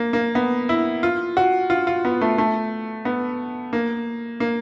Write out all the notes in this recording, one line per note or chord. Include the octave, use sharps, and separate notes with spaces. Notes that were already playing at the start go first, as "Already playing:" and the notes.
Already playing: A#3
A#3
B3
E4
F4
F#4
F4
F4
B3
A3
A3
B3
A#3
A#3